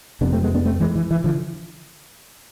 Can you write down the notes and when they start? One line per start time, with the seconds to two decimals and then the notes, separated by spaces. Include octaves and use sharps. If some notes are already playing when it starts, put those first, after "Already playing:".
0.21 F2 C3 B3 D4
0.33 A3 C4
0.43 G#3 B3
0.55 B3 D4
0.65 A3 C4
0.80 E3 G#3
0.96 E3
1.11 E3
1.24 D3 F3